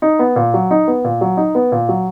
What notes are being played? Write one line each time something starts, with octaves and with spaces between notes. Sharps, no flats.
D#4
B3
A#2
F#3
D#4
B3
A#2
F#3
D#4
B3
A#2
F#3